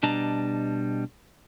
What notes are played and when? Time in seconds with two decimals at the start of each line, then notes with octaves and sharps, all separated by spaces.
0.03 B2 G3 D4 D#5 A5 A#5